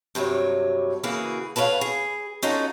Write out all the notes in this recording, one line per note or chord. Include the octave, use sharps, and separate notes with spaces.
G2 C3 F#3 C#5
C#3 E3 A#3 F#4 G#4 B4
A4 B4 C#5 D5 F5 F#5
G#4
C#4 D#4 F4 F#4 A4